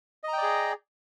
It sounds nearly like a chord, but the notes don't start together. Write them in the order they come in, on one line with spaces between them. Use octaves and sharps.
D#5 A#5 G5 D5 G#4